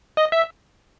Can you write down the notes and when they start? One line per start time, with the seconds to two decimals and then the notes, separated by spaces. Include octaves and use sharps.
0.17 D#5
0.32 E5